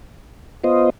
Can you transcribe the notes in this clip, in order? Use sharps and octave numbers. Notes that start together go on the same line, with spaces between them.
B3 F4 C5 D#5